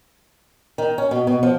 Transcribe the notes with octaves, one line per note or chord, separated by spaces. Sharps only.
D#3
C#4
B2
B2
F3